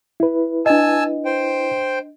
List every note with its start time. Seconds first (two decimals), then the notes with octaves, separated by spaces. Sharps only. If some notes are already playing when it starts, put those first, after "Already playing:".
0.20 E4 B4
0.66 D4 D#5 G#5 A5 E6
1.25 C5 G5